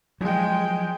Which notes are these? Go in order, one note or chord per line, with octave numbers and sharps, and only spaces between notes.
F3 F#3 G#3 G5